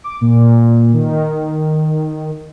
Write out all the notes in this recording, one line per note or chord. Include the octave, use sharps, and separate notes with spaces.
D6
A#2
D#3